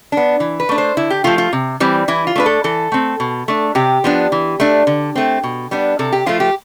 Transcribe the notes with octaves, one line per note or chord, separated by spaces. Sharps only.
B3 D4
E3
B4
A3 D4
C5
D3 E4
G4
F3 A3 F4
F4
C3
E3 G3 C4
E3 E4
F4
A3 D4 B4
A4
E3 A4
A3 C4
B2
A3 D4
C3 G4
F3 B3 D4
E3
A3 D4
D3
A3 C4
B2
G3 B3 D4
C3 A4
G4
F3 A3 F4
G4